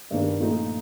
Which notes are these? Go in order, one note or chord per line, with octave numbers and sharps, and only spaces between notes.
G2 D#3 G3 D4 G4
A#2 F3 A3 D#4